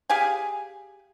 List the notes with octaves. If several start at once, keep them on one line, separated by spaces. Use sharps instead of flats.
G4 G#4 F5 G#5